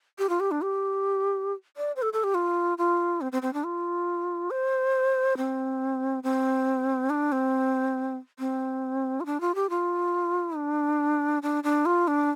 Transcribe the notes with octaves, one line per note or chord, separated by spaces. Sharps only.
G4
F4
G4
D4
G4
D5
C5
A4
A4
G4
F4
F4
C4
C4
C4
D4
F4
C5
C4
C4
D4
C4
C4
F4
D4
F4
G4
F4
D4
D4
D4
F4
D4